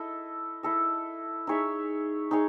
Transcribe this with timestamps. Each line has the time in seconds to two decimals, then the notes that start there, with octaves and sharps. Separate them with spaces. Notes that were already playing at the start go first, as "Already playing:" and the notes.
Already playing: E4 A4 D#5
0.63 E4 A4 D#5
1.47 D#4 G#4 C#5 E5
2.31 D#4 G#4 C#5